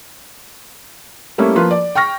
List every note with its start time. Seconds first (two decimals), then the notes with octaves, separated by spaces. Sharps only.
1.38 G3 A3 A#3 C#4 E4
1.55 F3 A#3 F4 B4
1.71 D5
1.95 G5 C#6 F6 A#6